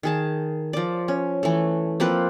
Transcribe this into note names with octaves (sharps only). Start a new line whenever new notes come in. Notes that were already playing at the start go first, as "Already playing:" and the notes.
D#3 G#4 A5
F3 D5
C#4
E3 A3
F3 A#3 C4 B4